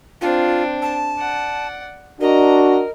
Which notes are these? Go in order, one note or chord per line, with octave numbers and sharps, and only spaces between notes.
C4 D4 F4
A5
D5 F#5
D4 F#4 A#4 D#5 A#5